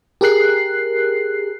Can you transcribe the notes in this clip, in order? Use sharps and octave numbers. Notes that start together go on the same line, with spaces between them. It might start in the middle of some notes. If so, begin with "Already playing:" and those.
G4 G#4 A#4 F#6 C7